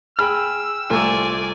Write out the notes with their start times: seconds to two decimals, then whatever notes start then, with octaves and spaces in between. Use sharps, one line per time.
0.19 G#4 G5 B5 E6 F6
0.90 C2 A3 F4 D5 G#5